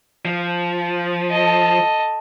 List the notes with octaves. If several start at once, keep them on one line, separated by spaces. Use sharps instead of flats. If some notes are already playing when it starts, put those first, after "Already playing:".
F3
A4 D#5